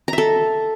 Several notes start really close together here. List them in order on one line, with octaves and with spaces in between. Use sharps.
A#5 E5 A4